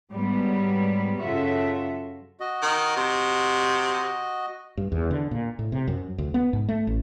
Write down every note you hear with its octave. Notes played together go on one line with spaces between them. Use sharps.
G#2 F#3 G3 B3
F#2 C#3 F4 F#4 A4 E5
F#4 D#5
D#3
C3
G2
E2
D3
A#2
A2
C3
F#2
D2
B3
G#2
A3
A1